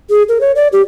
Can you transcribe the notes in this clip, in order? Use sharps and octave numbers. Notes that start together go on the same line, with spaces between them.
G#4
A#4
C#5
D5
G4